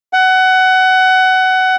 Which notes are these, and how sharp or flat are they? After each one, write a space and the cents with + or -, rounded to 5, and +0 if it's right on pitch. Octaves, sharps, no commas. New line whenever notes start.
F#5 +20